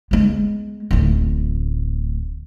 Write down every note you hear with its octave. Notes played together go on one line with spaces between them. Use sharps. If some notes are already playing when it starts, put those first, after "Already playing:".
G#3 B3
D1 A1